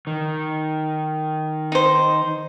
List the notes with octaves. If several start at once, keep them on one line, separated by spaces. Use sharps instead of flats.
D#3
D#4 C5